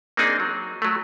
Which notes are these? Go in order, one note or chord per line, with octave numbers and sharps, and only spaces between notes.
A#3 C4 D4 D#4 G#4
F#3
F#3 A3